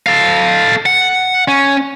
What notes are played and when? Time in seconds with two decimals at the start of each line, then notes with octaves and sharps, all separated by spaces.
0.06 A4 F5
0.86 F#5
1.48 C#4